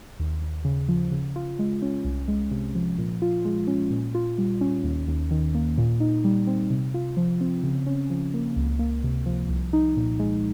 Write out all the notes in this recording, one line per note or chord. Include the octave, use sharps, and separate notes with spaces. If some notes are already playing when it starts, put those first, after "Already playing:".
D#2
D#2
C#3
F3
C#3
F4
G#3
C#4
C2
G#3
C3
F3
A#2
F4
G#3
C#4
A#2
F4
G3
C#4
D#2
D#2
D#3
A#3
A#2
D#4
G3
C4
C3
F4
F3
C4
C#3
C#4
F3
A#3
C#2
A#3
C3
F3
C2
D#4
A#2
G#3